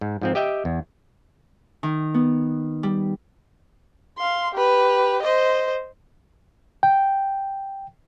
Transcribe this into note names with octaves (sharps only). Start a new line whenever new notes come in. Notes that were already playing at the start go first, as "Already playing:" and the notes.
G#2
G#2 F3 C4
G4 D#5 E5 G5
E2
D#3
B3
G3
F5 C6
G4 B4
C5 D#5
G5